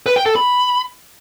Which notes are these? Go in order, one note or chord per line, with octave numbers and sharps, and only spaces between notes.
B4
G5
A4
B5